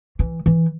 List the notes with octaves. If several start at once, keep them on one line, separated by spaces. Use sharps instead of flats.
E3
E3